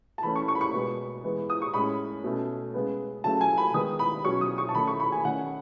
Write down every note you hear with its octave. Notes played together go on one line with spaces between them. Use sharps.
A5
E3 A3 C#4 B5
C#6
C#6
B5
C#6
B2 G#3 B3
E3 G#3 B3
D#6
C#6
A2 G#3 C#4 B5
B2 A3 C#4
C#3 G#3 B3
C#3 F#3 A3 A5
G#5
B5
D#3 G#3 B3 D#6
B5
B2 F#3 C#4 C#6
D#6
C#6
A5
D#3 A3 C#4 B5
C#6
B5
G#5
D#3 A3 C#4 F#5